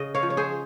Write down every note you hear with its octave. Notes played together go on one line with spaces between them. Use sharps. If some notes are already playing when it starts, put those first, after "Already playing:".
Already playing: C#3 D#5
C#5 F5
F3
C#5
G#4 C5